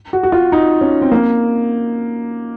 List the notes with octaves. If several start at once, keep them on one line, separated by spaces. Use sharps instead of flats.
F#4
F#4
F4
D#4
C#4
C4
A#3